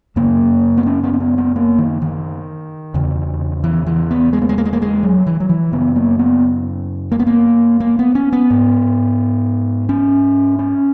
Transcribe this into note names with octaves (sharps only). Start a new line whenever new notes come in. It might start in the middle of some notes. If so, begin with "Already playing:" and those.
F#2 C#3 A#3
B3
C#4
B3
C#4
B3
B3
A#3
D#3
D#3
E2 C#3
E3
E3
B3
G#3
A#3
G#3
A#3
G#3
A#3
G#3
F#3
E3
F#3
E3
F#2 C#3 B3
A#3
B3
A#3
B3
A#3
A#3
B3
C#4
B3
G#2
C#4
C#4